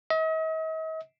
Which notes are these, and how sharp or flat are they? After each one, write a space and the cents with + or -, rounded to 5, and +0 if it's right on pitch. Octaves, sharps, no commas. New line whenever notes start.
D#5 +45